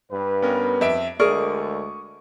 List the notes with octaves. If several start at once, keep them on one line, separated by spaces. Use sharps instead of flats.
G2 B4
B3 C#4 A#4
F2 D#5 E5 D7
D2 D3 G#3 G#4 A#4 D5 C#6 D#6